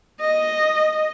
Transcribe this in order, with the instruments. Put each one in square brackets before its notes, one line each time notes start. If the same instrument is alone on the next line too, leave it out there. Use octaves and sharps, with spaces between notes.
[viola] D#5